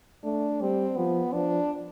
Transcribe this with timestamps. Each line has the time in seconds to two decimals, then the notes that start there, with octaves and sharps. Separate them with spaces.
0.24 A3 D4
0.61 G3 C4
0.97 F3 B3
1.33 F3 D4